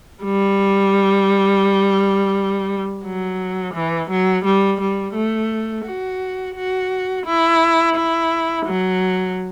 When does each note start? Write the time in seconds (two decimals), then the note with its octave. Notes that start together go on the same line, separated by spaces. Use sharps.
0.24 G3
3.04 F#3
3.74 E3
4.10 F#3
4.45 G3
4.81 G3
5.15 A3
5.86 F#4
6.55 F#4
7.26 E4
7.96 E4
8.66 F#3